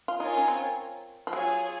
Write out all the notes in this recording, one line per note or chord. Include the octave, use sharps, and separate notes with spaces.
F4
D#4 F4 A#4 C#5 G#5
C#4
C4
F3
F#3 F4 G#4 C#5 G#5